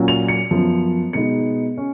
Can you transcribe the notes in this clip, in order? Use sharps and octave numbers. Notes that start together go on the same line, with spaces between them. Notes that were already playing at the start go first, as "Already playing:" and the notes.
Already playing: A#2 F#3 C#4
F7
C#7
F#2 F3 B3
B2 G#3 B3 D#4 C#7
C#4